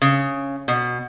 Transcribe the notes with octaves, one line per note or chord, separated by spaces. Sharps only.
C#3
B2